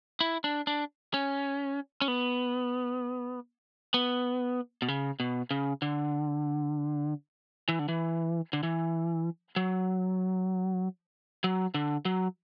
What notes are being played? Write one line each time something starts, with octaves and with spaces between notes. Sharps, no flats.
E4
D4
D4
C#4
C#4
B3
B3
B2
C#3
B2
C#3
D3
E3
D3
E3
D3
E3
F#3
F#3
D3
F#3